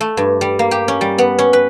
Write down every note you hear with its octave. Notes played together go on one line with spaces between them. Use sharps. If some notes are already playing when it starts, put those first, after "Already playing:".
A3
G2
G3
A#3
G4
C#4
G3
B3
C#4
B4